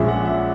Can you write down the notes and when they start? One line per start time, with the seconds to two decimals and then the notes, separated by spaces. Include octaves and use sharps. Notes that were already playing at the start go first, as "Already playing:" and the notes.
Already playing: A#1 A#2 G#3 C#4 E5
0.08 F#5
0.25 E5